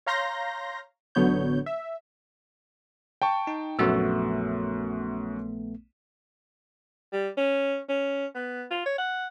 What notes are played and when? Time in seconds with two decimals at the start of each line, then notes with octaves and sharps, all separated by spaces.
0.06 C#5 F5 A#5 C6 G6 A#6
1.15 A1 D3 F#3 B3 C#5 G6
1.66 E5
3.22 G5 A5 C#6
3.47 D#4
3.79 A#1 F#2 A3 B3 F#4 E6
7.13 G3
7.37 C#4
7.89 C#4
8.35 B3
8.71 F4
8.86 C#5
8.98 F#5